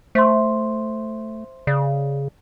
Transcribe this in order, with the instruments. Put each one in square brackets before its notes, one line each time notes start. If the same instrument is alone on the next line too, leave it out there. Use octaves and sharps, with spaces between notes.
[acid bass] A3 [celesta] C5 E5 C6
[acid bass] C#3 [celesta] D5